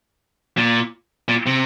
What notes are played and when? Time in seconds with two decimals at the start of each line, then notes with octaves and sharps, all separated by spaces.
0.57 A#2
1.28 A#2
1.46 C3